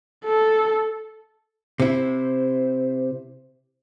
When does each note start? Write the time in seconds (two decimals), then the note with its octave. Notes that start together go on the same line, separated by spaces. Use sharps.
0.25 A4
1.80 C3 E4 C5